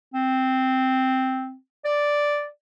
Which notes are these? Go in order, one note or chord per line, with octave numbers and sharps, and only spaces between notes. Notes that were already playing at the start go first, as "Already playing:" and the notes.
C4
D5